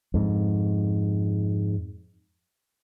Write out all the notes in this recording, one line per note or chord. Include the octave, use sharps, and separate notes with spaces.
F2 G#2